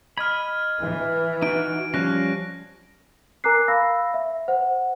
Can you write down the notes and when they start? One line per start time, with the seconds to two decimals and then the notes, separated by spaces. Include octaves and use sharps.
0.17 D#5 B5 F6 G#6
0.79 E3
1.42 D#4 F#4 D7
1.94 F3 G3 C#4 F#6 A#6
3.44 A#4 G#5 A#5 D6 F#6 C7
3.68 F5 B5 E6 A#6
4.14 E5
4.48 C5 F#5